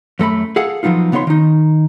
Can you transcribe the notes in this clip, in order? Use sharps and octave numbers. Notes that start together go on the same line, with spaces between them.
F#2 A3 A#5 B5
G#4 A4 F5 F#5
F3 F#3 B3 D#4 F4
C#3 B3 D#4 C#5 C6
D#3 D#4